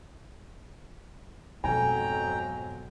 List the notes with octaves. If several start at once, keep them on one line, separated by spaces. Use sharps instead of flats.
F2 G#2 B2 F#3 G5 G#5 A#5